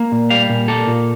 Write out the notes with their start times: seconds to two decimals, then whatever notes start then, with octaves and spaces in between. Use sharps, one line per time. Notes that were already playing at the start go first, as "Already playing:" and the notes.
Already playing: A#3
0.12 A#2
0.30 G3 F5
0.50 A#2
0.68 A#3 A4
0.87 A#2